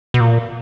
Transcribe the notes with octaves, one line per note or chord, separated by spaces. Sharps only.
B2
A#2